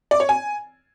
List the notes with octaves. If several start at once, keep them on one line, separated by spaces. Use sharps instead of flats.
D5
C#5
G#5